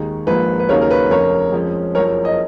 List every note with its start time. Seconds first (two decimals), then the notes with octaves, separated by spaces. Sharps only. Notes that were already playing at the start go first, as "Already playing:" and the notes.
Already playing: D#2 D#3 G#3 D#4
0.27 A#1 G#2 F3 A#3 B4
0.60 B4
0.69 D#2 C#3 F#3 A#3 D#4 A#4 C#5
0.81 A#4
0.91 B4
1.11 F1 F2 C#3 A#4 C#5
1.53 F2 F3 G#3 C#4
1.95 F#1 F#2 F3 A#4 C#5
2.25 D#5